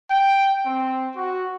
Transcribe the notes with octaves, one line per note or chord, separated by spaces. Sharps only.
G5
C4
F#4